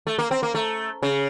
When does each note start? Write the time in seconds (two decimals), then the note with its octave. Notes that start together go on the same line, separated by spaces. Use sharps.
0.07 A3
0.19 A#3
0.31 C4
0.43 A#3
0.55 A3
1.03 C#3